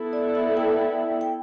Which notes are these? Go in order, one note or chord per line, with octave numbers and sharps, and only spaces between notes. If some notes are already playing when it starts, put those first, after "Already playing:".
Already playing: B3 E4 A4
D5
E5
G5
G5